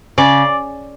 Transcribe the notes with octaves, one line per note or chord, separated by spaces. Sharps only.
C#3 D5